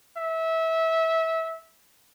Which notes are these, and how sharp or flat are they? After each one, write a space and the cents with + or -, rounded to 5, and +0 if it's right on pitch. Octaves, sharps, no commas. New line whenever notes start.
E5 -20